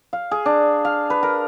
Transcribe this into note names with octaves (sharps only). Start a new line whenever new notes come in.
F5
G#4
D4
F5
B4
A#4